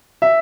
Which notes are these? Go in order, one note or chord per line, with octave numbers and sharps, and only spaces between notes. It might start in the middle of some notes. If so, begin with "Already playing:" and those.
E5